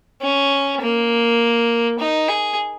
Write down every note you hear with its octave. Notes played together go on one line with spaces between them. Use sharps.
C#4
A#3
D#4
G#4